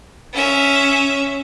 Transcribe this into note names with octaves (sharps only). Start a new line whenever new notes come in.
C#4 E5